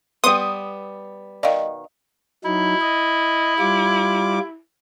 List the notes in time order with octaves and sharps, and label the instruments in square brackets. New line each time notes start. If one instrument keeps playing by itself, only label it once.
[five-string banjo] G3 B3 [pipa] C6 [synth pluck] D#6
[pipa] B2 D#3 [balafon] D5 D#5 F5
[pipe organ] F#3 D#4 [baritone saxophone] E4
[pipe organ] D#5
G3 F4 D6